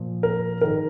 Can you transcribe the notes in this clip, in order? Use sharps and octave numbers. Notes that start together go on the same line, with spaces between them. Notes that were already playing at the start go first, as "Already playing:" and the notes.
Already playing: A#2 F3
A#4
G#2 D#3 A#4